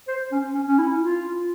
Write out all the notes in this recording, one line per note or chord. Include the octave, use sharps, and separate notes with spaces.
C5
C#4
C#4
C#4
E4
F4